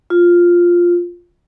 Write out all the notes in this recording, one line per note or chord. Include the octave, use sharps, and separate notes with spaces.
F4